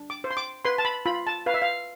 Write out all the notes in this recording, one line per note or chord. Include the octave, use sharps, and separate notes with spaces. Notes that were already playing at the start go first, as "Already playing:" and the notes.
Already playing: D4
D6
C5
C6
D6
B4 C6
A5
B5
F4 B5
A5
B4 F5
E5
F5